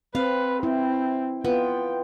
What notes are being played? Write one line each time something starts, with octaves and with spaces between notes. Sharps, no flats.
C4 B4 F5
C4 E4
B3 F4 G5